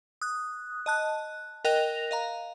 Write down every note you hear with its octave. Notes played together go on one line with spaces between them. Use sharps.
D#6 F#6
D#5 A5 F#6
A#4 D#5 G5 F#6 A#6 F7
D#5 F5 A#5